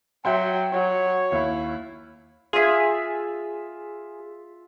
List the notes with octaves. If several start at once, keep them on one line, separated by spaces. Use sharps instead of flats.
F#3 E5 F#5 G5 C6
F#3 C#5
D#2 E4
F4 G#4 E5